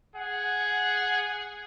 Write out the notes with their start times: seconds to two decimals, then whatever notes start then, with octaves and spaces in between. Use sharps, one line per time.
0.15 G#4 F#5